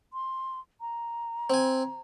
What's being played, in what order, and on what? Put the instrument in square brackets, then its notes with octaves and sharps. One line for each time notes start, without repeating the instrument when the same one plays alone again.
[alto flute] C6
A#5
[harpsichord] C4 G#5